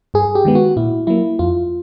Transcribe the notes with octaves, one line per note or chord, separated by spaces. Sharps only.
G2 G#4
G4
D#3 G#3 B3
F#4
A#2 E4
F#3 A#3 E4
F2 F4